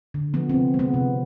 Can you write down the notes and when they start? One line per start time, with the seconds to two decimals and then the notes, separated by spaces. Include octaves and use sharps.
0.14 D3
0.34 F3 B3
0.49 C3 C4
0.74 G#3
0.79 B3
0.94 C3